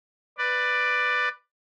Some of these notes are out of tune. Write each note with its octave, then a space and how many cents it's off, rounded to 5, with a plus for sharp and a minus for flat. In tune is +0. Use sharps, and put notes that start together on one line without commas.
B4 +5 D5 +10